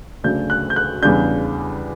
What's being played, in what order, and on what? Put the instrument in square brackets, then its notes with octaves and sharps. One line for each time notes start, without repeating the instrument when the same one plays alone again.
[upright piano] D2 C#3 F#3 A3 D4 G6
F#6
G6
F#6
E2 C#3 G3 D4 G6